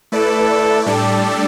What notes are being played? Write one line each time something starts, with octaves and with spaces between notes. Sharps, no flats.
A3 E4 A4 B4 D5
A2 G3 D4 G4 A4 D5